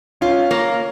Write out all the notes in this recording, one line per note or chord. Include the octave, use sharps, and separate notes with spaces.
C#4 F4
A#3